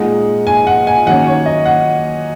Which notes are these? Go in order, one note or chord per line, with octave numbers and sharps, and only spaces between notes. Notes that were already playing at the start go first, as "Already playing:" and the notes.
Already playing: A#2 G#3 D#4 F#5
G#5
F#5
G#5
D#3 F#3 A#3 C#4 F#5
C#5
D#5
F#5